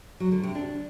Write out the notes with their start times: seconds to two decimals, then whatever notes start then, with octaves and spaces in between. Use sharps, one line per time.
0.20 F#3
0.32 D3
0.43 C3
0.55 D4